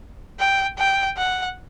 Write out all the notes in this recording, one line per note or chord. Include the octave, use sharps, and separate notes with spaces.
G5
G5
F#5